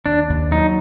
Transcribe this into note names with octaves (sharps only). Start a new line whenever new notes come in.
D#2 D4
D#2
F#3 D#4